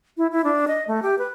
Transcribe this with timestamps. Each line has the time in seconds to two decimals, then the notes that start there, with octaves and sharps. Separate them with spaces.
0.17 E4
0.32 E4
0.44 D4
0.68 D#5
0.88 A3
1.02 G4
1.18 B4